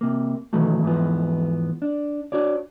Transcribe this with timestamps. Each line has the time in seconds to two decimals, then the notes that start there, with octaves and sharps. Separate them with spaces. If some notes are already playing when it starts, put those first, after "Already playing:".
0.01 C3 A#3
0.53 B2 D#3 E3 F#3 A3
0.83 E2 G#2 E3 F3 B3
1.82 D4
2.32 D4 F#4 C#5 D5